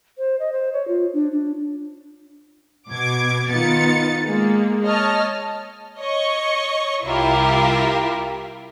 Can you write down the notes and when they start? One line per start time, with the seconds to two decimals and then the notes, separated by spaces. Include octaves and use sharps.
0.18 C5
0.39 D#5
0.53 C5
0.73 C#5
0.88 F4
1.14 D4
1.31 D4
2.90 B2 D6 G#6
3.50 D#3 B3 D#4 F4 A6 C#7
4.28 G#3 A#3
4.83 C#5 D#5 A5 F6
5.99 C#5 D#5 C#6
7.04 C2 E4 F4 G4 A#4